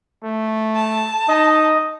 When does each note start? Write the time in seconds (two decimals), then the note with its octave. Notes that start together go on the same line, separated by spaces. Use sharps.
0.24 A3
0.76 A5
1.28 D#4 D#5